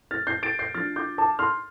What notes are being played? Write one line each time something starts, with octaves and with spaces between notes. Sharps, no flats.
F6 A6
G6 C7
A6 D7
G6 C7
F3 D4 F6 A6
D6 G6
A5 D6
C6 F6